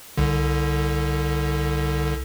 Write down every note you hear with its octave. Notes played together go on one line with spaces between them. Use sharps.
C2 D3